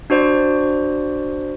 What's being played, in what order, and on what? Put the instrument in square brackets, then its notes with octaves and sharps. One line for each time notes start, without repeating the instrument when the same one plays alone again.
[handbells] D4 F#4 C5 D5